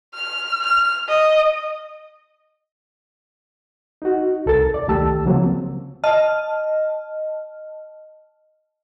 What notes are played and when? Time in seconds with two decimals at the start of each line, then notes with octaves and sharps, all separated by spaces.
0.14 F6
0.63 F6
1.08 D#5
4.02 D#4 F#4
4.46 C2 A4 A#4 A6
4.74 E2 D5
4.88 C2 D#3 A3 G4 A5 E6
5.26 C#3 F3 F#3 A#3 C4
6.04 D#5 A5 F6